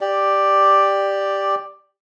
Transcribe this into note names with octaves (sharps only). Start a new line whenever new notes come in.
G4 D5